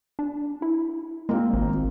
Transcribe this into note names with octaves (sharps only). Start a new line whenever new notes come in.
D4
E4
G#3 A#3 C4 F4
G#1